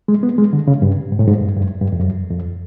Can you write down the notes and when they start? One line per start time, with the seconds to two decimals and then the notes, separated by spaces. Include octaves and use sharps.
0.08 G#3
0.23 B3
0.38 G#3
0.53 D3
0.68 C#3
0.82 G2
1.12 G#2
1.19 A2
1.27 G#2
1.42 G2
1.56 G2
1.61 F#2
1.81 G2
1.92 F2
2.00 F#2
2.30 F2